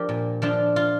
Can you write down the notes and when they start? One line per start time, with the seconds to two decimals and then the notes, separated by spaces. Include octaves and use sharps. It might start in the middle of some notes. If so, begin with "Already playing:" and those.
Already playing: F3 D4 G4 A#4
0.09 A#2
0.42 F3 D4 F4
0.76 F4